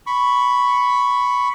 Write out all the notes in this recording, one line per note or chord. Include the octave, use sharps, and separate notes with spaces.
B5 C#6